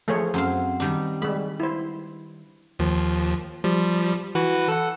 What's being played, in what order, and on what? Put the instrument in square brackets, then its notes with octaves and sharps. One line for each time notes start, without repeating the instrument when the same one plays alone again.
[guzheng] F3 [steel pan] A3 G#4 C#5
[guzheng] F#2 C4 F5
D#3 G3 D4
[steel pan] G3 G#3 [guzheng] B5
[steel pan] E4 C5
[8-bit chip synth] D#2 F3
F3 G3
E3 F#4 B4
A4 F#5